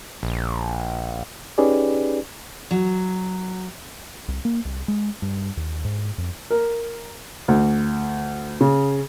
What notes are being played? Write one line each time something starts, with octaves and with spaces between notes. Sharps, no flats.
A#1
C#4 D#4 G4 G#4 B4 D5
F#3
C2
A#3
C2
G#3
G2
D#2
G#2
F2
A#4
D2
C#3